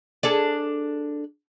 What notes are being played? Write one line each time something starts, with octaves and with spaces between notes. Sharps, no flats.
D4 G#4 A4